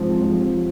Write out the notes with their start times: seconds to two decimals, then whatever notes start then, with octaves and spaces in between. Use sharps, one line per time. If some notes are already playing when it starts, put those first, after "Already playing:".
Already playing: G#2 F3 C4
0.20 G#2 F3 C4